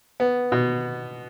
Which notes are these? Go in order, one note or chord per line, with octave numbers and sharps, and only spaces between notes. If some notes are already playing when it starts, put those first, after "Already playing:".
B3
B2